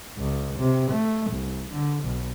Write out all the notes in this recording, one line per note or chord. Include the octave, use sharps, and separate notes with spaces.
C#2
C3
A3
C2
D3
B1